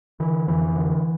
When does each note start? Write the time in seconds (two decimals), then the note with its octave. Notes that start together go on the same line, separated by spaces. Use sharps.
0.20 D3 E3
0.47 F2 E3
0.76 D3